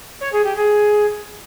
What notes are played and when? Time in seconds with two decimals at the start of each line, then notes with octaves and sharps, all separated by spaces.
0.20 C#5
0.32 G#4
0.44 G4
0.56 G#4